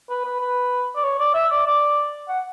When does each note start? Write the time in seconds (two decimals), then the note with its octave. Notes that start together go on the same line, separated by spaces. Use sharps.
0.10 B4
0.25 B4
0.40 B4
0.96 D5
1.04 C#5
1.19 D5
1.35 E5
1.51 D5
1.66 D5
2.29 F#5